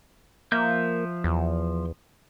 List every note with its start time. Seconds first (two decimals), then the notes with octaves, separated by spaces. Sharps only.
0.52 F3 A#3 E5 G6
1.24 E2